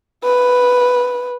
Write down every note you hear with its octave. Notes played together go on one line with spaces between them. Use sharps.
B4